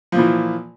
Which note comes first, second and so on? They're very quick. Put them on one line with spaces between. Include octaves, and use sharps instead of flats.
F3 A#2 E3